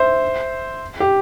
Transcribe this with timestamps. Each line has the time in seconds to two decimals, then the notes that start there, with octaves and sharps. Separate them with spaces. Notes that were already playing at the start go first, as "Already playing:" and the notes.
Already playing: C5 E5
1.00 G4